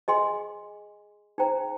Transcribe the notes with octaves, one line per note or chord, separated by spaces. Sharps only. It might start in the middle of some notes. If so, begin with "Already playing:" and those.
G#4 D#5 G#5 C6
D#4 G#4 C5 G5 A#5